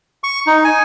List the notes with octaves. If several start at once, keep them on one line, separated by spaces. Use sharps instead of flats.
C#6
D#4
G#5